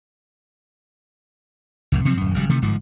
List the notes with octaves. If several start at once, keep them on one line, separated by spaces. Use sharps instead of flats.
C2 F2 A2
C3 F3 F#3 C4
D1 F#2
G#1 C#3 F#3 G3
C3 D#3 E3 A3
G1 G#2 F3